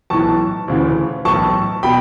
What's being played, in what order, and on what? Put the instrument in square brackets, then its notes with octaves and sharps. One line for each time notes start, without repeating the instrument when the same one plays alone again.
[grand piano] B1 A2 E3 A5 C#6
D2 C#3 E3
B1 A2 E3 A5 C#6
B2 G5 B5